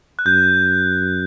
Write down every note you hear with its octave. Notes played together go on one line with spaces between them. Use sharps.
F#6
F#2 G6